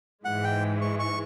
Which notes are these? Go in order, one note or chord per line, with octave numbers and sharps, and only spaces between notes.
G#2 E3 G#3 F#5
G5
C#6
C#6